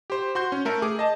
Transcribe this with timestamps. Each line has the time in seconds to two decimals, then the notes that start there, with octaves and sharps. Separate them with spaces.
0.10 G4 C5
0.35 F#4 C6 G6
0.52 C#4
0.65 A3 A4 A#4 E5
0.82 G#4 D6
0.99 D#5 A5